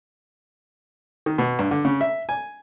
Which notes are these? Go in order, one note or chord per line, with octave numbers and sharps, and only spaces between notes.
D#3
B2
G2
D3
C#3
E5
G#5